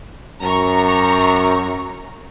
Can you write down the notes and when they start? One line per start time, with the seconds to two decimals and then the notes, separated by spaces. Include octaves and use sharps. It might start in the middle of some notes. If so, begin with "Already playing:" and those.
0.41 F#2 A#5 C#6